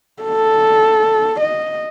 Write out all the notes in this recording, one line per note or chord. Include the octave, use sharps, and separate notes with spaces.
A4
D#5